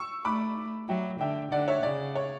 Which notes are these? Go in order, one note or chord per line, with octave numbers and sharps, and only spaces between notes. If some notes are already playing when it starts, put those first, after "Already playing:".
Already playing: C#6 E6
A3 B5 D6
F#3 E5 G5
D3 E5 G5
D3 D5 F#5
C#5 E5
C#3 D5
C#5